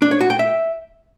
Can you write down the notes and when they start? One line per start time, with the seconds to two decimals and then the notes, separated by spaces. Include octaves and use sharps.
0.02 D4
0.11 C#5
0.21 F#4
0.30 G5
0.39 E5